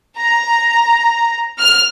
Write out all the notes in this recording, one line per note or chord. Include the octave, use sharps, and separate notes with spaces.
A#5
F6